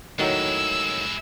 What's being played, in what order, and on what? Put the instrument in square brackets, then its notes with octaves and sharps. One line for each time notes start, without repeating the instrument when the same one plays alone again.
[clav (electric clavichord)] A2 D#3 F#3 [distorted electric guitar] G#3 E4 [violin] E6